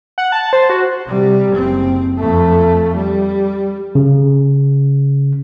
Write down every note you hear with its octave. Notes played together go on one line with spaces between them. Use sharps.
F#5
A5
C5
F#4
C3 G3
F#1 C4
F2 A3
G3
C#3